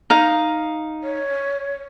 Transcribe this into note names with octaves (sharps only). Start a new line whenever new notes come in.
D#4 F5
C#5